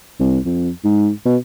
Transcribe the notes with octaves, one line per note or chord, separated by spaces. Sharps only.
C2
F2
G#2
B2